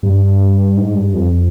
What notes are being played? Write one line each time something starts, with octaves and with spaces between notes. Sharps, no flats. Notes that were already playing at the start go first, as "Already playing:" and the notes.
G2
G#2
G2
F2